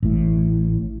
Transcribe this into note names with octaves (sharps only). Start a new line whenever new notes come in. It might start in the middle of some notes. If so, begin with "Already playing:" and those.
A1 A2